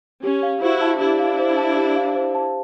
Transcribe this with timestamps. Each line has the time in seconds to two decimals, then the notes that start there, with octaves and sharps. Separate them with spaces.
0.24 C#4 G4
0.43 F5
0.62 E4 F#4 C5
0.81 A5
1.00 D4 E4 G4
1.19 F5
1.39 C5
1.57 A5
1.77 G4
1.96 F5
2.15 C5
2.35 A5